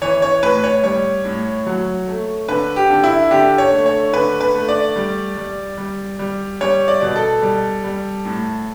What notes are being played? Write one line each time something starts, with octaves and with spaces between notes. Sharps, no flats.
E3 C#5
C#5
A2 B4
C#5
G3 C#5
A2
F#3
A3
D3 B4
G4
D3
E4
D3 G4
C#5
A3
C#5
D3 B4
B4
A3
D5
G3
G3
G3
G3
G3 C#5
D5
B2
A4
G3
G3
A2